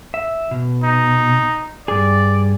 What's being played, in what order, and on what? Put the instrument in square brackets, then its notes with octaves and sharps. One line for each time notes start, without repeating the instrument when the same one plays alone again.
[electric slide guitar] E5
B2
[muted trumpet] D#4
[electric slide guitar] G2 G#4 [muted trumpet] D5